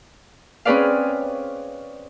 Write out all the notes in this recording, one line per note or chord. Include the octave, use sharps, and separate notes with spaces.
C4 C#4 G#4 B4 D5 F5